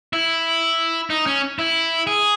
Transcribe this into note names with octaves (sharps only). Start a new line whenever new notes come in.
E4
D#4
C#4
E4
G#4